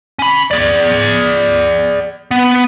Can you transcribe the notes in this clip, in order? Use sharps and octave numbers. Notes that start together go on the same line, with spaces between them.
C#4 B5
G#4 D5
B3